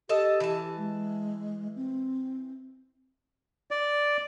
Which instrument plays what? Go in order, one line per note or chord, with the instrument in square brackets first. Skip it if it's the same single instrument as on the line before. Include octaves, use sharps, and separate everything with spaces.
[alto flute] G4 [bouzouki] A4 D#5 A5
[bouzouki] E3 A5
[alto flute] G#3
C4
[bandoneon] D5